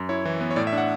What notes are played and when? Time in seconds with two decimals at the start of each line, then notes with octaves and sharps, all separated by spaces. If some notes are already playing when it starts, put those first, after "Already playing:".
Already playing: F#2
0.09 E4 C#5
0.25 E3
0.40 B3
0.51 C#5
0.56 A2 D5
0.67 E5
0.73 D4 F#5